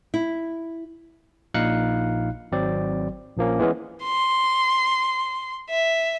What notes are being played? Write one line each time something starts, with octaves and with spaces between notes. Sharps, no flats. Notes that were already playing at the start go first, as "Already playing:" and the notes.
E4
A#1 A#2 D#4 F5 F#6 C#7
G#1 F#3 C4 D5
A#1 F3 A#3 C#4
E3 G#3 B3 C#4
C6
E5